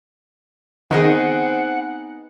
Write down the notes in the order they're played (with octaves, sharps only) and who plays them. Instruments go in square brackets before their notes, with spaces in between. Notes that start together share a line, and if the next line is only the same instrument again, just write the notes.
[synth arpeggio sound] D#3 [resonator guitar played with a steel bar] B3 D#4 G#4 [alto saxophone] C4 [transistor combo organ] F#5